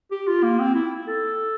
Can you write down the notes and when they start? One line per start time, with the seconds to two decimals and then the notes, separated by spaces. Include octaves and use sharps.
0.11 G4
0.27 F4
0.43 A#3
0.59 C4
0.75 E4
1.07 A4